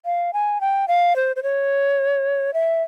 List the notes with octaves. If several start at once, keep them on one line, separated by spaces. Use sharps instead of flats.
F5
G#5
G5
F5
C5
C5
C#5
E5